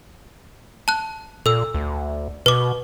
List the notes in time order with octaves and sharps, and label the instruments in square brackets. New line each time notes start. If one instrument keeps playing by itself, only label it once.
[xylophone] A5 F#6
[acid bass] A#2 [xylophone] A4 E6
[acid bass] D2
[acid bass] B2 [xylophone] B4 D6